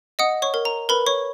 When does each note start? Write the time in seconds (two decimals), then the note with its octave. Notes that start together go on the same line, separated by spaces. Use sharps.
0.19 D#5 F#5 D#6
0.42 C#5 C#6
0.54 A#4
0.65 A#5
0.89 A#4 B4 B5
1.06 C#5 C#6